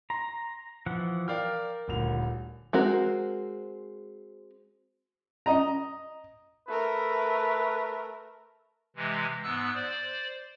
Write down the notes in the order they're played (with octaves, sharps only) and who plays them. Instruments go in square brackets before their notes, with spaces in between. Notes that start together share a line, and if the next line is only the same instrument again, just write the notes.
[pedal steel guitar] A#5 [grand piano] C6
[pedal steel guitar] E3 F3 F#5
[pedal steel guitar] A#4 F6 [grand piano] D5 F5 G5
[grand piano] D#1 D2 F7
[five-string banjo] G#3 C4 F#4 A#4
[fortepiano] D#5 A#5
[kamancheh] A3 A#4 [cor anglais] B4
[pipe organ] C3 E3 G#3
G#2 B3 E6 F#6
C5 D5